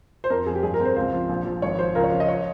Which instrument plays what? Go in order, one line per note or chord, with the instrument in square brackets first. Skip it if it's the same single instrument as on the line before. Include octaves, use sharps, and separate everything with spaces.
[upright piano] C5
F2 A#4
F3 G#4
G4
G2 G#4
A#4
C4
C5
C#2 C5
F3
A#1
F3
G#1 C#5
F3 C5
C#2 A#4
C#5
F3
D#5
C#5